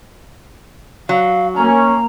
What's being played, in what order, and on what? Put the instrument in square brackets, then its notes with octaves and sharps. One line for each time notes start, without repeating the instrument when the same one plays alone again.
[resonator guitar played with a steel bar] F#3 [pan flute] F5
[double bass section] A#3 [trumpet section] C#4 [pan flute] A#5